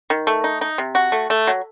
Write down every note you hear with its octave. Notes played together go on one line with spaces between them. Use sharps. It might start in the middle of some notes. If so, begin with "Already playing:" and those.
D#3
A3
D#4
D#4
C3
F#4
A3
A3
F#3